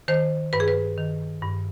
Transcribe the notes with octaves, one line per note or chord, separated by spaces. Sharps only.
D#3 C5
G2 B4
G#4
B4
D#3
G2